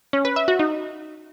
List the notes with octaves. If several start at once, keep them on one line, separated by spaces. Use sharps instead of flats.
C#4
B4
E5
F#4
D#4